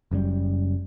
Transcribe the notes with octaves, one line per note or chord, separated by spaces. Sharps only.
F#1 F#2 A#2 G3